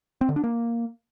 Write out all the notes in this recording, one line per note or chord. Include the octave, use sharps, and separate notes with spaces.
C4
D3
D4
A#3